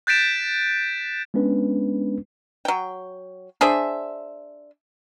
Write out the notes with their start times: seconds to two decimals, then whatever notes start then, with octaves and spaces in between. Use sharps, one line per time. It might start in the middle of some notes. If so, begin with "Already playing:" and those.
0.07 F#6 G6 A6 B6 D7 E7
1.34 G#3 B3 C#4 D4 B4
2.65 F#3 G5
3.61 D4 G#4 C5 E5